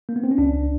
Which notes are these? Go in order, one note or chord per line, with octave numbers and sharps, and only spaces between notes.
A#3
B3
C4
C#4
C#2 D4